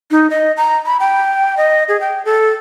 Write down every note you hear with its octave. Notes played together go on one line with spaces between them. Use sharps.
D#4
D#5
A#5
B5
G5
D#5
G#4
G5
A4